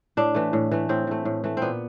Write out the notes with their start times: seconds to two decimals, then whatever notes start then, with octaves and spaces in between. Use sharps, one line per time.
0.17 A2 D4
0.35 E3 A3
0.53 A2
0.71 E3 A3
0.89 A2 C4
1.07 E3 A3
1.25 A2
1.44 E3 A3
1.57 A#2 B3 C4